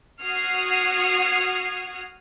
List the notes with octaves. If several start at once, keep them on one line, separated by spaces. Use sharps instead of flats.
F#4 F#5 D#6 F6 G#6 C7